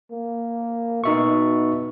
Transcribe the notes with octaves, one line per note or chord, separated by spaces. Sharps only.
A#3
B2 D#4 E5 C#6